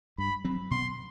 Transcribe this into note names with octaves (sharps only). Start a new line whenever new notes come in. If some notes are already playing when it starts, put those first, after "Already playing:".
G2 B5
F#3 C4
B2 C6